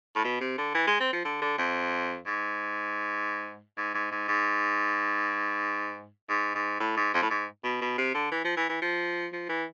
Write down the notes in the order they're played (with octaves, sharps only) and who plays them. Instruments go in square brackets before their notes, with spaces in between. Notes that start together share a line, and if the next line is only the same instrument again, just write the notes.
[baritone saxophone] A2
B2
C3
D3
E3
G#3
C4
F3
D3
D3
F2
G#2
G#2
G#2
G#2
G#2
G#2
G#2
A2
G#2
F2
A2
G#2
B2
B2
C3
D3
E3
F3
E3
E3
F3
F3
E3